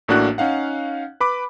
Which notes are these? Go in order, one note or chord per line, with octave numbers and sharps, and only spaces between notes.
A1 A2 A#3 D4 F#4 F#6
C#4 D#4 F5 F#5
B4 B5 D6